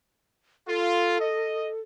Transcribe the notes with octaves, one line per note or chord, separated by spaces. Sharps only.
F4 A4
D#5